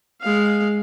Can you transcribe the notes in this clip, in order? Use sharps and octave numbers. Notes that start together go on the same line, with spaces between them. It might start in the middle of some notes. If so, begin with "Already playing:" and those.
G#3 F5